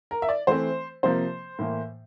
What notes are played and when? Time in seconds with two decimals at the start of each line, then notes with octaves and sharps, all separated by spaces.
0.11 A#4
0.22 E5
0.29 D5
0.47 E3 A3 C4 C5
1.03 C3 F3 A#3 C5
1.59 A2 E3 A#3